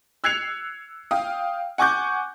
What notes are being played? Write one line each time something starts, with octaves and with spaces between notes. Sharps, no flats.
E6 F#6 G#6 C7 C#7 F7
F5 G5 D#6
F#5 G#5 C#6 D6 F#6 G6